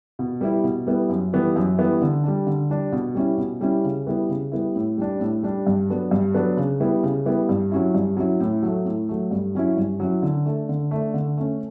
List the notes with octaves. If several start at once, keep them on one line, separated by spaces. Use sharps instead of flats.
B2
G3 B3 E4
B2
G3 B3 E4
F#2
E3 G3 B3 E4
F#2
E3 G3 B3 E4
D3
G3 D4
D3
G3 D4
B2
G3 C#4 E4
B2
G3 C#4 E4
C#3
G3 B3 E4
C#3
G3 B3 E4
A2
G3 D4
A2
G3 D4
G2
F#3 B3 D4
G2
F#3 B3 D4
C#3
G3 B3 E4
C#3
G3 B3 E4
G2
F#3 C#4 E4
G2
F#3 C#4 E4
A2
F#3 A3
A2
F#3 A3
G2
F#3 C#4 E4
G2
F#3 C#4 E4
D3
A3 D4
D3
A3 D4
D3
A3 C#4